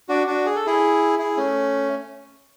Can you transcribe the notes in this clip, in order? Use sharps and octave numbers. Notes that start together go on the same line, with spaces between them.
D4 F#4
D4 F#4
G#4
A4
E4 G#4
E4 G#4
A3 C#4